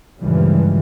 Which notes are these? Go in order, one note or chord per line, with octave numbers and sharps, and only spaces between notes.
C#2 G2 A#2 E3 F3 G3